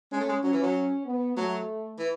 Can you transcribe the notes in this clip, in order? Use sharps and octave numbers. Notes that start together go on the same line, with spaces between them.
G#3 C#4
A3
G#3
F#3 C#4
E3
F#3
B3
F#3 A3
E3